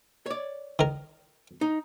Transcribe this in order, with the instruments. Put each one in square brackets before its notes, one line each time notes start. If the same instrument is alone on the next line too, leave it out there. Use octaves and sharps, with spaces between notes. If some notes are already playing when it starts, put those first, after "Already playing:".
[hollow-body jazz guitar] C#5 D5
[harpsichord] D#3 A#4
[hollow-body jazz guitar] D#4